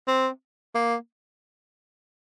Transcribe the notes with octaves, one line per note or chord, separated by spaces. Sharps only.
C4
A#3